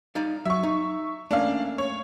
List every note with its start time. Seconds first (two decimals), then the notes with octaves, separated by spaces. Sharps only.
0.15 D#4 D5 F5
0.45 F#3 E5 C#6
0.63 D#4
1.31 A3 A#3 C#4 D4 F5
1.78 C#5